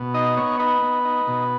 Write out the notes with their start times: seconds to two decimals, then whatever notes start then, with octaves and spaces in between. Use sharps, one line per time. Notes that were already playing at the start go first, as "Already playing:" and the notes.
Already playing: B2
0.14 D#4 D#5
0.37 B3 C#5
0.59 D#4 B4
0.82 B3
1.05 D#4
1.27 B2